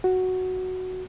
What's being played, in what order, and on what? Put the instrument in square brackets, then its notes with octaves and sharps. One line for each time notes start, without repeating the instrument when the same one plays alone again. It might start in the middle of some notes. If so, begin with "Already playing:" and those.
[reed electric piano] F#4